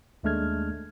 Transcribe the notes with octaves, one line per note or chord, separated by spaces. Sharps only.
D#2 G#3 A3 D4 F6 G#6